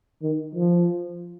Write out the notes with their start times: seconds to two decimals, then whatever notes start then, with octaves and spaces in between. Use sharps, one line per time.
0.22 D#3
0.55 F3